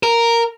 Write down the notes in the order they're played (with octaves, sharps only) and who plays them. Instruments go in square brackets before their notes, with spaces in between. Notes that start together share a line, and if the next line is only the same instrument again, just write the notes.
[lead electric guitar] A#4